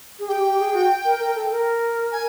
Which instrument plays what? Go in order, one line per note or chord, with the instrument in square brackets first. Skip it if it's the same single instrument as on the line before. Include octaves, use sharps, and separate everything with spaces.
[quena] G#4
[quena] G4 [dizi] G5
[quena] G4
G#4
F#4
A#4
A#4
A4
A#4
[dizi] G#5